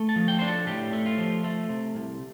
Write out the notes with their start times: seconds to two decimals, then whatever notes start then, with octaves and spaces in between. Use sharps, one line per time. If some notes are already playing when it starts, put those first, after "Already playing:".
Already playing: A3
0.09 A5
0.16 F3
0.28 G5
0.39 D4 C5
0.48 A4
0.67 A2 G4
0.93 A3
1.06 F4
1.18 F3
1.44 A3
1.69 C3
1.95 C2